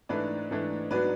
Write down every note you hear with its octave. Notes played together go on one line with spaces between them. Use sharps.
G#2 E3 A3 D4 B4 D5
G#2 E3 A3 D4
G#2 F#3 B3 D4 B4 D5